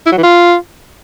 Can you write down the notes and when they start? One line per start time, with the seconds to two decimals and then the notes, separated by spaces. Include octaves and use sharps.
0.06 E4
0.12 F#3
0.17 E3
0.23 F4